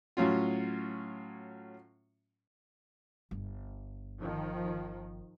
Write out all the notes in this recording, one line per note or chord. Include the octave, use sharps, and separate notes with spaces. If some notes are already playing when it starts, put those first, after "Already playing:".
A2 F#3 C#4 F4
G1
D#3 F3